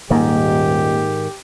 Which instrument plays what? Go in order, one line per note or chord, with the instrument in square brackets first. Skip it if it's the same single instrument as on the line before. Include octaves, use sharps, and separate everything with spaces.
[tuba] D#1 [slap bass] G#2 D#3 [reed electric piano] A#3 [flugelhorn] G4